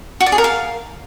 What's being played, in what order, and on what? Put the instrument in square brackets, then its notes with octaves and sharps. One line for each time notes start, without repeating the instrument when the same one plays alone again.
[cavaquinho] F#4
D5
G#4
A#4
F5